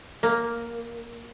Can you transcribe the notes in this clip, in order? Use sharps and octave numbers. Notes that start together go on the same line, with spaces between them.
A#3